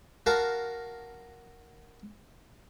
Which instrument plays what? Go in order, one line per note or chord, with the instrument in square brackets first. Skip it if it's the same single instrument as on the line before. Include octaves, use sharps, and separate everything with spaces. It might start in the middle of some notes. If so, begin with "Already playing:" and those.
[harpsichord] F#4 A#4 F5 A5 A#5